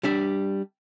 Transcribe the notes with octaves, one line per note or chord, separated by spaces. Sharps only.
G3 D4 E5